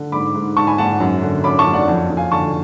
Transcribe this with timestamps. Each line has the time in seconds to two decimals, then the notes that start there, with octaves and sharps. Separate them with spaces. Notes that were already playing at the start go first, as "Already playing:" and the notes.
Already playing: D3
0.12 G#2 B5 D6
0.35 G#2
0.56 G#2 A5 C#6
0.67 G#5 B5
0.78 G#2 F#5 A5
1.00 F#2
1.22 D3
1.44 F#2 B5 D6
1.59 A5 C#6
1.66 F#2
1.73 D5 F#5
1.88 F2
2.10 F2
2.17 F5 G#5
2.32 D3 A5 C#6